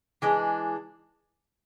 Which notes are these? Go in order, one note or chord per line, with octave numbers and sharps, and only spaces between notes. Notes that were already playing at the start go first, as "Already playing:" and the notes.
E3 G#3 D4